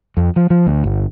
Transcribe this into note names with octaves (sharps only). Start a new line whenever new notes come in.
F2
F3
F3
D2
G1